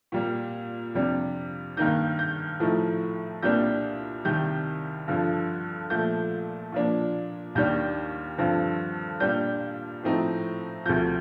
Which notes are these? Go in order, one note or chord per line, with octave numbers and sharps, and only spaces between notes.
A#2 G3 A#3
F2 C3 G3 D4
G2 D#3 A#3 D#4 G6
G6
A2 F3 A3 D#4
C2 A#2 G3 A#3 D4 G6
C2 C3 D#3 G3 G6
G2 D3 F3
A#2 F3 A3 G6
A#2 F3 A#3 D4
D#2 D#3 G3 D4 G6
G2 D3 F3 C4
A#2 G3 D4 G6
A2 F3 A3 C4 D#4
D2 C3 F3 G6